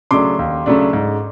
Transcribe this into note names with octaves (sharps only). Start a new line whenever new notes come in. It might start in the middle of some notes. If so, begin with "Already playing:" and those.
C#3 F#3 A3 D4 C6 D6
D#2
C#3 F#3 A3 D4
G#2